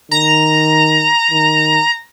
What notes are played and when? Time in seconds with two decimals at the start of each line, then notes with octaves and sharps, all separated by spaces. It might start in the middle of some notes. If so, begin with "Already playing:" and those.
0.11 D#3 A#5
1.31 D#3